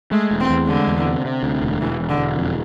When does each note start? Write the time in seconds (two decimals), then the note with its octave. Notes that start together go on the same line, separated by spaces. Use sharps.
0.12 G#3 A3
0.31 E1
0.40 C4
0.50 E2
0.68 D3 G#3
0.88 E2
1.06 C3
1.25 C3
1.43 D2
1.62 E1
1.80 E1 E3
2.00 E1
2.09 D3
2.18 E1
2.37 F2